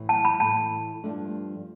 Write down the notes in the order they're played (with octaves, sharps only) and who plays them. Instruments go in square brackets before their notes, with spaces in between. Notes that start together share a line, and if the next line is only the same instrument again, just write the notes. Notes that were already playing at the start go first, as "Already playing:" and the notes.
Already playing: [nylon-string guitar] A2 E3 A3
[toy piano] A5
B5
[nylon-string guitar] A2 E3 A3 [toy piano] A5
[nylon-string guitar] G2 F3 A3 D4